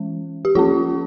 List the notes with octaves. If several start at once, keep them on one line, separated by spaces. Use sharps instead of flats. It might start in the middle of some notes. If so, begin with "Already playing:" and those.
Already playing: E3 G#3 C#4
G4
F3 A#3 C#4 F4